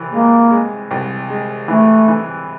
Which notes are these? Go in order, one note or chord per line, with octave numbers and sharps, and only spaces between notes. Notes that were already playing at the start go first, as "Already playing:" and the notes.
Already playing: C2 E3
G#3 A#3
G#3
C2
G#3
E3 A3
E3